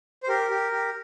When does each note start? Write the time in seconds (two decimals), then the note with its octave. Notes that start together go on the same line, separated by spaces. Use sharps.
0.23 C5
0.28 G4 A#4
0.50 G4
0.72 G4